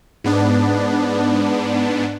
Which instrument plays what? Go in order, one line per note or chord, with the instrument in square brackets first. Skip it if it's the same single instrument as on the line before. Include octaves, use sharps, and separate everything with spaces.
[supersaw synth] G#2 B3 D4